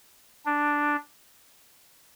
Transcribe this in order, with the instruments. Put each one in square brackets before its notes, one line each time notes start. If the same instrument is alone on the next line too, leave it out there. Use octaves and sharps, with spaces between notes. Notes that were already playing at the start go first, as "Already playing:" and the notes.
[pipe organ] D4